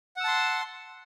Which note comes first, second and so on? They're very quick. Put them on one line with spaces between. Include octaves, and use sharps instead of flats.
F#5 E6 A5 C6